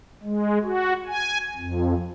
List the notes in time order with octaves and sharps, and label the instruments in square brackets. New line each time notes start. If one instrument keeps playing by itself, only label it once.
[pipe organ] G#3
F#4
G#5
F2